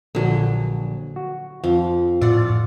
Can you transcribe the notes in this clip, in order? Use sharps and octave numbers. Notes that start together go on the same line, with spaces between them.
A#1 D3 F#3
F#4
F2 F3
A2 F4 D5 F#5